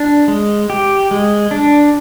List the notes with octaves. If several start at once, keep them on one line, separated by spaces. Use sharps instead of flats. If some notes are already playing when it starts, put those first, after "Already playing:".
Already playing: D4
G#3
G4
G#3
D4